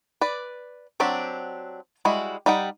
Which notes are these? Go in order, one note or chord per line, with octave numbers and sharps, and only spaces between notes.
B4 D5
F#3 C4 D4 F#4 G4
G3 G#3 E4 F#4
G3 D#4 F#5 G5